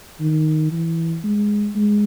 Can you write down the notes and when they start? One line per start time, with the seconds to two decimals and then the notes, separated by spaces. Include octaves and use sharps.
0.21 D#3
0.72 E3
1.24 G#3
1.75 G#3